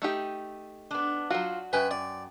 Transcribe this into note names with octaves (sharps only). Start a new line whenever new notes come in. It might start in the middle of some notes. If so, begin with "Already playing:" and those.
A3 D#4 G4
B3 D4
F#3 F4 F#4
F#2 B4 G5 G#5
D5